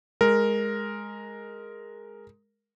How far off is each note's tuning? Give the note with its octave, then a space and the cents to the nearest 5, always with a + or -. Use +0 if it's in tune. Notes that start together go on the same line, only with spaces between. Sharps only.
G#3 +0 A#4 +0